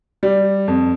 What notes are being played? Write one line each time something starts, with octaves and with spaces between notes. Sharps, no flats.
G3
F2